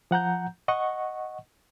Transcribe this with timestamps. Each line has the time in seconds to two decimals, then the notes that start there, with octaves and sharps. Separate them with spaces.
0.11 F3 F#5 A#5 G6
0.68 D#5 F#5 C#6